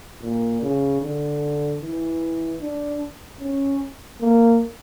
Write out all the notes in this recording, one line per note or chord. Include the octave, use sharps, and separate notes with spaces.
A#2
C#3
D3
E3
D4
C#4
A#3